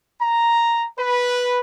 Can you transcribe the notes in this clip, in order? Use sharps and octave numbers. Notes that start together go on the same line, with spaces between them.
A#5
B4